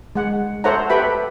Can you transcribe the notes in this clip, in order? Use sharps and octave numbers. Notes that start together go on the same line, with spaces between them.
G#3 F#5
A4 C5 C#5 E5 F#5 A#5
G4 A4 B4 E5 G5 B5